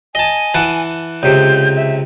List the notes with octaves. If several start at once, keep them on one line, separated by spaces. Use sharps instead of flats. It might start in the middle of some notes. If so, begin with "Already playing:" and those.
D#5 G#5 A5
E3 F#5 A5
C#2 C3 G6
E5